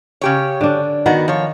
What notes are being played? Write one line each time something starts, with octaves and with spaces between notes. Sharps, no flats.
C#3 G4 C#5
D3 D4
D#3 B3 F#4
F3 C#5